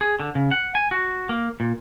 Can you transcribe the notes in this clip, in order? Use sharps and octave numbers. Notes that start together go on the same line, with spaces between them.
G#4
D3
C#3
F#5
G#5
F#4
A#3
A#2